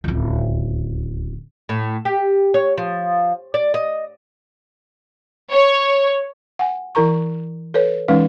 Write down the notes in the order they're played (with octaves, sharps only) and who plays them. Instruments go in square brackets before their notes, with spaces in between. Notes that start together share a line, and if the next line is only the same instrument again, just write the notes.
[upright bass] D1 C#2
[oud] A2
G4
C#5
F3
D5
D#5
[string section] C#5
[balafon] F#5 G#5
E3 E4 A#4 A#5 C#6
A4 B4 C#5
E3 G#3 C#4 D#4 B4 F5